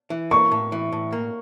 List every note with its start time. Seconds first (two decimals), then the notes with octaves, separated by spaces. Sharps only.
0.10 E3
0.31 A#3 C#6
0.52 A2
0.72 E3
0.92 A2
1.12 A#3